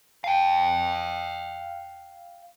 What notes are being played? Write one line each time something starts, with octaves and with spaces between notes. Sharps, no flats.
F5 G5